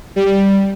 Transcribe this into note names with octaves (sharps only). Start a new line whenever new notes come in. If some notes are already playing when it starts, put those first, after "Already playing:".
G3